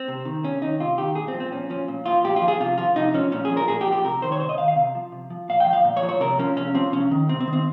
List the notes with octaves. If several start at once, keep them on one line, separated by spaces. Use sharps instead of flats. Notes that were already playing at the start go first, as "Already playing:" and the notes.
Already playing: C4
C3
D#3
C3 C#4
D#3 D#4
C3 F4
D#3 G4
A#2 G#4
C4
F3
C4
A#2 C#4
F3 C#4
A#2
F3 F4
A#2 G4
F4
F3
G#4
C3 F4
F3 F4
C3 D#4
F3 C#4
A#2 C#4
G#4
F3
A#4
A#2 G#4
G4
F3
G4
C3 A#4
D#3 C5
C#5
C3 C5
D#5
D#3 F5
F5
C3
F3
C3
F3
A#2 F5
G5
F3
F5
A#2
C#5
F3
C#5
C3 A#4
F3 C#4
C3 C#4
F3 C4
C3 C#4
D#3
C3 C4
C4
D#3
C4